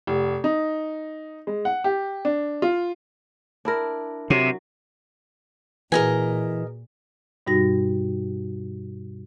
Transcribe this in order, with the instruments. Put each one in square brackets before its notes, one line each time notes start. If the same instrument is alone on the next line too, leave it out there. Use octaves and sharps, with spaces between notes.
[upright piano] F1
D#4
G#3
F#5
G4
D4
F4
[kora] D4 E4 A#4
[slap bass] C3 [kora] F#3
[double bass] A#2 [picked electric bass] E3 [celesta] F#4 G#4 B4 [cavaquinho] A#4 D#5 G#5
[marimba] G2 B2 G3 D#4 F#4 A#6